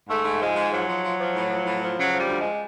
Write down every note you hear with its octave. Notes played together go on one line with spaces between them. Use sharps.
G#2 A3
G#2
F3 G#3
G#2
F3 F#3
F3
F3
F3
A2
F3
A2
F3
C#3 F#3
F3 G3
D2
G#3